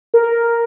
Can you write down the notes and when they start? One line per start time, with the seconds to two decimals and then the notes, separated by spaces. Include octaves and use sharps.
0.14 A#4